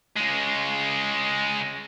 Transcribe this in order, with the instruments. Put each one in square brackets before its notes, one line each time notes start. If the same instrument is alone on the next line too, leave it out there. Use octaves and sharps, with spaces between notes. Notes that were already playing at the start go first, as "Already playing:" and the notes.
[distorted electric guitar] C#3 G#3